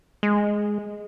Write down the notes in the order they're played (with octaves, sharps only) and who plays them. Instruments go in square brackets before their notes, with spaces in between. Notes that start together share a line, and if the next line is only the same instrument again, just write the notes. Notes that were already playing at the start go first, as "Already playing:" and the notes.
[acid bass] G#3